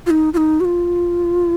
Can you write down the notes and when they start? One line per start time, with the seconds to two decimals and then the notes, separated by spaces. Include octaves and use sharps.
0.06 F4
0.11 D#4
0.34 F4
0.37 D#4
0.60 F#4
0.65 F4